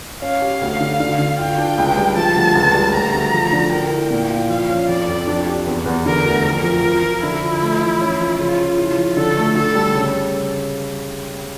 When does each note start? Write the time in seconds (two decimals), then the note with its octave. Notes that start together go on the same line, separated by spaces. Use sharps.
0.22 C#4 F5
0.42 G4
0.61 D2
0.80 D3
1.00 D3
1.19 D3
1.39 F4 G5
1.58 D4
1.78 C#2
1.97 G3
2.16 F3 A5
2.36 D2
2.55 C#2
2.74 G3
2.94 D2 A#5
3.14 D2
3.33 F3
3.53 D3
3.72 A#4 G5
3.91 E4
4.11 A#2
4.30 F4
4.50 F3 F5
4.69 C#4
4.89 F2 D5
5.09 F2
5.27 D4
5.47 G4
5.67 E2
5.86 E2
6.06 D3 A#4
6.25 D2
6.44 F2 A#4
6.64 F3
6.83 F3
7.03 F3
7.23 D3 E4
7.42 F3
7.61 A3
7.81 E3
8.01 C#4
8.20 F3
8.39 C#3 F4
8.59 C#3
8.78 E4
8.98 F3
9.17 D3 A4
9.37 A3
9.55 D3 A4
9.75 G3
9.95 C#3